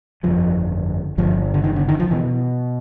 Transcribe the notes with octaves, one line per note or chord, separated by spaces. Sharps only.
G1 F2 D3 F3
G1 G2 D3 F3
D3
D#3
D3
D#3
F3
B2 E3